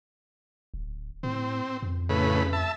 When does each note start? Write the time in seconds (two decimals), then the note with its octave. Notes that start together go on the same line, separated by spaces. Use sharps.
0.74 D1
1.23 A2 C4
1.82 F2
2.09 A2 C#3 B4
2.53 E5 A5